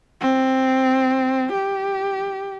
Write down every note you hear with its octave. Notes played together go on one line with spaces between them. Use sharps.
C4
G4